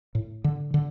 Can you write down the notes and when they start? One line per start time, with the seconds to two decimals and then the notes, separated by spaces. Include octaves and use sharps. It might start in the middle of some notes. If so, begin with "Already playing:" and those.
0.15 A2
0.44 D3
0.74 D3